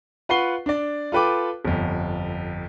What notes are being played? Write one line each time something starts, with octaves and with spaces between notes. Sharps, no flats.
F4 B4 F#5 C#6 C7 G7
D4 D5
F4 A4 B4 G5 D6
G1 F2